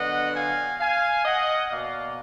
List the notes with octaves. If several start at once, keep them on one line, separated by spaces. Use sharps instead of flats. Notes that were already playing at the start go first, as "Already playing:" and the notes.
Already playing: D3 F#3 B3 D#5 F#5
F5 G#5
F5 G#5
D#5 F#5
B2 A#3 D5 F5